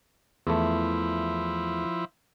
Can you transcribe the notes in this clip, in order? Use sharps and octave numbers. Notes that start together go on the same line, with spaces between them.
E2 F3 A3 E4